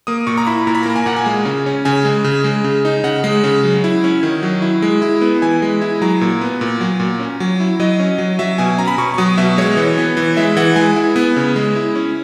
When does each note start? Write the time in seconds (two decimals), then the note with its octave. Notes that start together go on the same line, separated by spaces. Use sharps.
0.07 A#3 D#6
0.27 A#2 C#6
0.37 A#5
0.47 E4 B5
0.67 A#2 A#5
0.75 B5
0.83 A#3 A#5
0.96 G#5
1.06 A#2 F#5
1.16 G#5
1.26 G#3
1.45 C#3
1.66 C#4
1.85 C#3 G#5
2.05 G#3
2.24 C#3
2.44 G#3
2.64 C#3
2.85 D#4
3.04 C#3 F#5
3.24 G#3
3.44 C#3
3.63 F#3
3.84 E4
4.04 C#4
4.23 D#3
4.42 F#3
4.62 E4
4.82 G#3
5.02 E4
5.22 B3
5.42 E3 G#5
5.62 G#3
5.82 E4
6.02 F#3 A#5
6.21 A#2
6.41 B3
6.61 A#2
6.81 F#3
7.00 A#2
7.20 C#4
7.40 F#3
7.60 E4
7.80 F#3 D#5
8.00 C#4
8.18 F#3
8.39 F#3 E5
8.58 B2 G#5
8.78 C#4 A#5
8.88 B5
8.98 B2 C#6
9.14 C#6
9.18 F#3 D#6
9.38 B2 E5
9.58 G#3 C#5
9.77 E3
9.98 B3
10.17 E3
10.37 G#3 E5
10.57 E3 F#5
10.76 G#3 G#5
10.96 E4
11.16 B3
11.36 C#3
11.56 G#3
11.76 E4
11.95 C#4